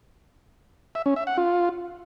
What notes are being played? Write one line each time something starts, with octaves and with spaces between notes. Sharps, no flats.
E5
C#4
E5
F#5
F4